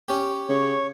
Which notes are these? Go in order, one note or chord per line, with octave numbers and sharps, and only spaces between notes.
C#4 G4
C#3 C#5